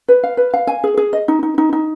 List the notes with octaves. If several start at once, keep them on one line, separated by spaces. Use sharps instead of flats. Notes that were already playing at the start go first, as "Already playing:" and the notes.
B4
F5
B4
F5
G#5
G#4
G#4
D#5
D#4
D#4
D#4
D#4